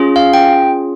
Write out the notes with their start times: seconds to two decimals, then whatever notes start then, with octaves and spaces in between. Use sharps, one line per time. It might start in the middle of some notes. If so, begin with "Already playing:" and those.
Already playing: C#4 F4 G#4
0.16 F5
0.34 G5